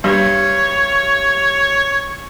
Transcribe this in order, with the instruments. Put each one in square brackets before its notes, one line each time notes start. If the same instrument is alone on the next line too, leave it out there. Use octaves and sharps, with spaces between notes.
[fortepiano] G2 [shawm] C#5